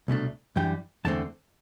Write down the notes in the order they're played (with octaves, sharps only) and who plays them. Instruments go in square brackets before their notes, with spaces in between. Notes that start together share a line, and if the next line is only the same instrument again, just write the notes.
[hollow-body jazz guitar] C2 B2 A3 D4
F#2 E3 G3 D4 G5
E2 D3 A3 C4 A5